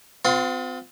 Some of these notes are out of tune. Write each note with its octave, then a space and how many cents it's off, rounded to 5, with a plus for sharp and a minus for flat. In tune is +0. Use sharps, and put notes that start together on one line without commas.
C4 -40 F4 +30 C6 +0